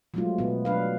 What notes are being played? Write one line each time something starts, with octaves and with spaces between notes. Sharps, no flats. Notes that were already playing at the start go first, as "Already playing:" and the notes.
F3 F#3 G#3 A3 C#4 F4
B2 F3 B3
F#3 D4 B4 F5